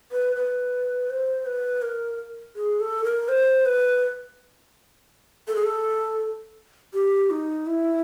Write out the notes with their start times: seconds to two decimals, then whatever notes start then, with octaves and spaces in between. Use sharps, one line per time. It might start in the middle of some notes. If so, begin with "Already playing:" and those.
0.12 B4
0.36 B4
1.10 C5
1.46 B4
1.82 A#4
2.56 G#4
2.80 A4
3.04 A#4
3.28 C5
3.65 B4
5.48 A4
5.56 G#4
5.64 A4
6.93 G4
7.30 D#4
7.66 E4